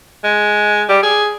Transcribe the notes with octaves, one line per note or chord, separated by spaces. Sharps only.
G#3
G3
G#4